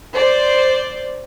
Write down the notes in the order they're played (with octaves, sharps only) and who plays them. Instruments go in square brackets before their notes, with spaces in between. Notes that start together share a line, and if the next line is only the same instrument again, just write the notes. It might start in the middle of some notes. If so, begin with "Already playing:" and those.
[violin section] C5 D5